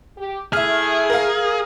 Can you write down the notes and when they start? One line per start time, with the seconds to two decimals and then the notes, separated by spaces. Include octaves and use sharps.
0.18 G4
0.53 A3 E4 G#4 E5 F6
1.10 A#4 F5